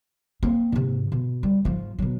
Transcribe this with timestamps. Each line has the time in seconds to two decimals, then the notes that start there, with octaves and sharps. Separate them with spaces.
0.43 A#3 C4
0.72 G#2 C3
1.12 B2
1.43 G3
1.65 G#2 F3
1.99 B2 F#3